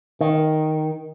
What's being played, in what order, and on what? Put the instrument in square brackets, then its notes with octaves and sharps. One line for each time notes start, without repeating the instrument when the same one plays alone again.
[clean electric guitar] D#3